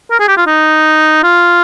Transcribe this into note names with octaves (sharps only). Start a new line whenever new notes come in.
A#4
G#4
G4
F4
D#4
F4